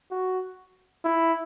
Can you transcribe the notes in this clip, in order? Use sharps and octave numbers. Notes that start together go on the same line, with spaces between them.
F#4
E4